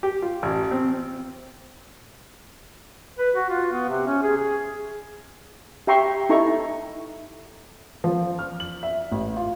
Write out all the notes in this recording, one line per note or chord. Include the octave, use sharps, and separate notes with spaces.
G4
F4
A1
C4
B4
F#4
F4
B3
C3
C#4
G#4
G#4
G4 E5 G5 A#5 C6 C#6
D#4 E4 A4 A#5 C#6
F3
F6
F#7
E5
A1
F4